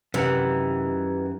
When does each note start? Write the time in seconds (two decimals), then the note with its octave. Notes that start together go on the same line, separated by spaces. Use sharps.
0.14 F#2 C3 D#3 E3 G4 F#5 A#5